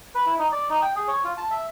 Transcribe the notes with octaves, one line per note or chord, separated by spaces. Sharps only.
B4
E4
D#4
D5
D#4
G5
G#4
C#5
F4
A5
E5